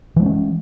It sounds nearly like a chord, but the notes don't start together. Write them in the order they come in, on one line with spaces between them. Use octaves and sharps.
E3 G#3 C4 C#4